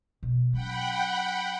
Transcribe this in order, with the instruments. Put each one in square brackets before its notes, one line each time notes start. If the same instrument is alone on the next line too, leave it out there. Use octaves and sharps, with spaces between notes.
[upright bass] B2
[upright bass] F#3 C#4 [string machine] F#5 G5 B5